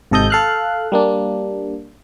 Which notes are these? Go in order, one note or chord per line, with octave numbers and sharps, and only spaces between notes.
G#1 C3 A4 D#5 D#6 G6
A4 F5 F#6
G3 A#3 D4